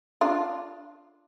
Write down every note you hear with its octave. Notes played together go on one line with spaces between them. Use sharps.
D4 F4